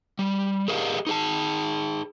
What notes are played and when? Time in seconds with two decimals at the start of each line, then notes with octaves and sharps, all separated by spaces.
0.19 G3
0.68 G4 G#4 A#4 D5 D#5 F5
1.07 D#4 G#4 A5